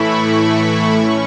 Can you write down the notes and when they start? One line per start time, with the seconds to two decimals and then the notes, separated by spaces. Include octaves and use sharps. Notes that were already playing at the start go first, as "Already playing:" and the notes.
Already playing: A2 E3 A3 E4 B5 C#6
0.25 C#6
0.95 C#4